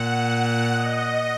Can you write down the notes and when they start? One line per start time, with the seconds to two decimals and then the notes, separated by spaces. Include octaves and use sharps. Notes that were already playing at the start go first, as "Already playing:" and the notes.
Already playing: A#2 F#5
0.73 D#5